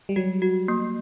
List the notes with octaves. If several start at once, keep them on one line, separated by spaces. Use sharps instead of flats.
G3
F#3 F#4
F#4
A#3